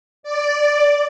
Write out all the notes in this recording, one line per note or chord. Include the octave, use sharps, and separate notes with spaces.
D5